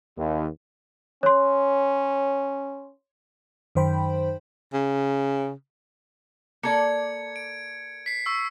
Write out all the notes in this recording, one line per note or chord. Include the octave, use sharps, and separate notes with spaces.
D#2
C#4 C#5 C6
F#2 D#3 C5 G5 B5
C#3
A#3 A4 D5 G#6 C#7
D7
B6 C7
C#6 E6 C7